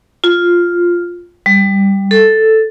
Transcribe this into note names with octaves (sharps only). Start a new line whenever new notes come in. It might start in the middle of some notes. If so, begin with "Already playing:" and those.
F4
G3
A4